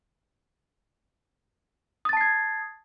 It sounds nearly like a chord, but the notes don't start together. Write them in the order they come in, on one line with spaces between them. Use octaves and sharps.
D#6 A6 A5 C7 G#6